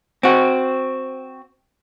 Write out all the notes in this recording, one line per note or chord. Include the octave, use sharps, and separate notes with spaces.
C4 F#4